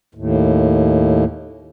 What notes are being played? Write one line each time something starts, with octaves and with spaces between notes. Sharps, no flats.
D#2 A2